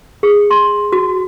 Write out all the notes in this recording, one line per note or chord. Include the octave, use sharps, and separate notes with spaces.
G#4
C6
F#4